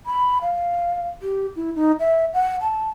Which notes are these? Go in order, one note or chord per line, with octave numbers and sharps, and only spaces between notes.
B5
F5
G4
E4
D#4
E5
F#5
A5